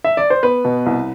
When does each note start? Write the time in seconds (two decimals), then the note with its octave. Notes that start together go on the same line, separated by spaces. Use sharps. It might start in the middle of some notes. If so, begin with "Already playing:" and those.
0.04 E5
0.17 D5
0.30 C5
0.43 B3 B4
0.65 B2
0.86 C2